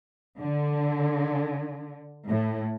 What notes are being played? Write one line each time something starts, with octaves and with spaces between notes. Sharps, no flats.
D3
A2